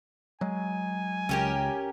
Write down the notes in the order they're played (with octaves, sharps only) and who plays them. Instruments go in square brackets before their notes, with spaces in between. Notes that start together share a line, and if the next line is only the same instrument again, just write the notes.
[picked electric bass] F#3 G#3 [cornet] G#5
[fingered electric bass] C#2 [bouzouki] C#4 G4 A#4